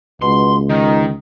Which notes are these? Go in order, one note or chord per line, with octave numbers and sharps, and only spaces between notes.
C#2 B2 C6
D#3 D#4